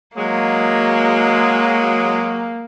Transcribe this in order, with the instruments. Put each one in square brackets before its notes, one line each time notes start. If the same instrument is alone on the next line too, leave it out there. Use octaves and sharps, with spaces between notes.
[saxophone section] F#3 G#3 [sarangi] A#3